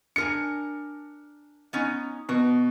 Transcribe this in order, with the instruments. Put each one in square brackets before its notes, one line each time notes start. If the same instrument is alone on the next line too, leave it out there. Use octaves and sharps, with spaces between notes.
[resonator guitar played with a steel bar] D4 A#4 G#5 [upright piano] C#7
[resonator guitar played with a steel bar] B3 C#4 D#4
[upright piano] B2 [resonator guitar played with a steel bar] F#4